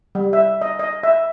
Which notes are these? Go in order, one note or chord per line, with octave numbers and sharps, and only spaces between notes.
G3
E5
D#5
D#5
E5